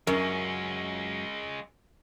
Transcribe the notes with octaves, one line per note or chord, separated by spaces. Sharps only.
F#2 G#3 C#4 A#4